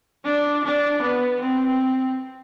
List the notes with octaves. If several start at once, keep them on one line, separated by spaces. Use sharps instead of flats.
D4
D4
B3
C4